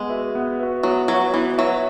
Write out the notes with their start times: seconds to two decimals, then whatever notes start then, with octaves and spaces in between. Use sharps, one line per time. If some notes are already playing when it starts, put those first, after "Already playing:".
Already playing: G#3 B3
0.09 F#4 B4 E5
0.35 B3
0.59 F#4 B4 E5
0.83 F#3 B3
1.08 F#3 F#4 B4 E5
1.34 E3 B3
1.58 F#3 F#4 B4 E5